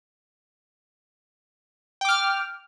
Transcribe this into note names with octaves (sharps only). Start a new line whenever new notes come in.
G5 D6 F6